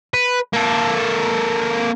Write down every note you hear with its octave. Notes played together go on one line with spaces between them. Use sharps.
B4
A#3 A4